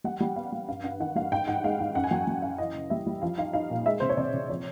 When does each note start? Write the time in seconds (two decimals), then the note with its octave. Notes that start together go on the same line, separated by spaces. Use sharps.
0.04 G3 F#5
0.20 G3
0.36 B3 F5
0.52 G3
0.68 G2 F5
0.84 G2 F#5
1.00 D#3 F#5
1.15 G3 F5
1.32 G#2 G5
1.48 G#2 F#5
1.64 G#3 F5
1.79 G#2 F#5
1.95 F#2 F#5
2.04 G#5
2.11 F#3 G5
2.27 F#3
2.42 F#2 F5
2.58 E3 D#5
2.75 C#3
2.90 G3 E5
3.06 G3
3.22 F3 F5
3.38 D#4 F5
3.53 D#4 F5
3.71 A#2
3.86 G#3 E5
4.00 C3 C5
4.09 C#5
4.17 C3 D5
4.34 C3
4.50 F3 C#5